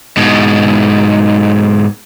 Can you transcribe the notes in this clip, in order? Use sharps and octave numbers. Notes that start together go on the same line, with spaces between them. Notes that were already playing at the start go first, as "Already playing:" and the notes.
G#2 B2